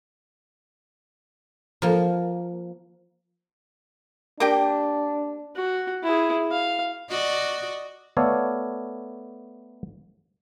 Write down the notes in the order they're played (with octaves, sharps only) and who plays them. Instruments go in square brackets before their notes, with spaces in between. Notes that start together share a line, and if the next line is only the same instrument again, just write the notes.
[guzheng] F3 A#3
[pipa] A#3 G4 G5 [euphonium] D4
[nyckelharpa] F#4
E4 G#4
F5
[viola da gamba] F#4 D5 D#5
[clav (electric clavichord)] A3 B3 A4 C#5 D5 F5